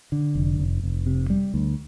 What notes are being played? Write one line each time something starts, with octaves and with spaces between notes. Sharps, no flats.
D3
F1
F1
F1
C3
G3
D2